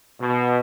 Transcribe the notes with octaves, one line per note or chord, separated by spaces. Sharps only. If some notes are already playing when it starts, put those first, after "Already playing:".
B2